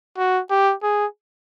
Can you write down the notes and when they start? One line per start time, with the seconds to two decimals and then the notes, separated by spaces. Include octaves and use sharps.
0.18 F#4
0.50 G4
0.83 G#4